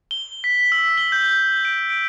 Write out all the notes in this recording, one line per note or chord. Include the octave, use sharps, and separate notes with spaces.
G7
B6
E6
G7
G6
D7
D7